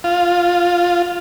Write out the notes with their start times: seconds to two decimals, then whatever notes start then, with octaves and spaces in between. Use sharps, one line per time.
0.04 F4